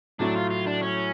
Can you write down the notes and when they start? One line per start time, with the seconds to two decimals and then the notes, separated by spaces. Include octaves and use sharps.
0.20 A2 F#3 A3 D4
0.36 F4
0.51 F4
0.67 D4
0.83 C#4